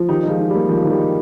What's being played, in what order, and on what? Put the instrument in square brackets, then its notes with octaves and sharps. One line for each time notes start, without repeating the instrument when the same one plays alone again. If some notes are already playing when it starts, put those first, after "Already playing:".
Already playing: [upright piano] F3
[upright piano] D#3 [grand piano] D#4 G4
[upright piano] D#4
[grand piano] F3 G#3
[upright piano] D#4
[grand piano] G3
[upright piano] A#3
[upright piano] D#3 [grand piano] F3
[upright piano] D#3
[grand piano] G3
[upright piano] D#4